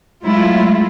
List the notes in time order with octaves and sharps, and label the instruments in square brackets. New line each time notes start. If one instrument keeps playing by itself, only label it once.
[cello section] F#3 G#3 A3 E4 F4